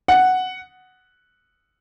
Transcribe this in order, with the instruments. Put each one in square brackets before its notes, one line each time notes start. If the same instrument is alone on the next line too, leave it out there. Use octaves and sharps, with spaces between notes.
[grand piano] F#5